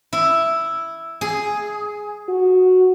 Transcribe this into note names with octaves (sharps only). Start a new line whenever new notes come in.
E4
G#4
F#4